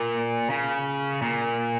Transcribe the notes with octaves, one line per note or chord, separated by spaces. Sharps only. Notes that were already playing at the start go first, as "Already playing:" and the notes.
Already playing: A#2
C#3
A#2